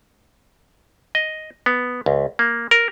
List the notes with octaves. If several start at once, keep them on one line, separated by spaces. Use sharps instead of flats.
D#5
B3
C#2
A#3
A#4